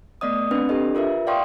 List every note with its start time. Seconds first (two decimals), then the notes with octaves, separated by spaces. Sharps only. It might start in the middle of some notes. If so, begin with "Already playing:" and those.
0.21 A3 B3 D5 D#5 D#6
0.51 C4 D4 B4
0.69 D4 G4 A4 D#5
0.95 F4 A#4 B4 E5
1.27 D5 F5 G5 C6 C#6 D#6